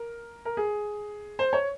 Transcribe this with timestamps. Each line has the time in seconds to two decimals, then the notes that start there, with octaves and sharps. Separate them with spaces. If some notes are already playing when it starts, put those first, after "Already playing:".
Already playing: A#4
0.45 A#4
0.57 G#4
1.39 C5
1.53 C#5